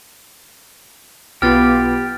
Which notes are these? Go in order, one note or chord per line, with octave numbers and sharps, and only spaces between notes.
B1 B3 F4 G4 F6 A6